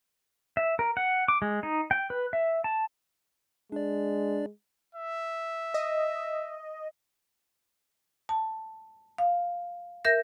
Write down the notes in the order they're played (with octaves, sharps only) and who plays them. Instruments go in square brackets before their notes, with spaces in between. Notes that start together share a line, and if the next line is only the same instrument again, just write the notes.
[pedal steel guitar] E5
A#4
F#5
D6
G#3
D#4
G5
B4
E5
A5
[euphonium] G#3 [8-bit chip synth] D4 D5
[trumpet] E5
[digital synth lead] D#5
[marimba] A5
F5
A#4 E5 G6 A#6